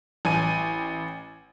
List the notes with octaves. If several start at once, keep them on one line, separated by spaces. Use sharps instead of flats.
A1 G#5 D#7